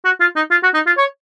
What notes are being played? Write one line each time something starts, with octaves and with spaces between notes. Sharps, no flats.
F#4
F4
D#4
F4
F#4
D#4
F4
C#5